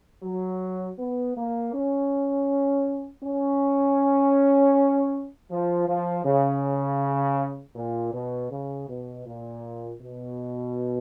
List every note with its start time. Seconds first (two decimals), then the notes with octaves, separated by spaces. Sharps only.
0.23 F#3
0.98 B3
1.36 A#3
1.73 C#4
3.24 C#4
5.50 F3
5.87 F3
6.25 C#3
7.75 A#2
8.13 B2
8.50 C#3
8.88 B2
9.25 A#2
10.01 B2